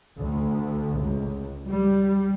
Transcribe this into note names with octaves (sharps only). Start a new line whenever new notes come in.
D2
C#2
G3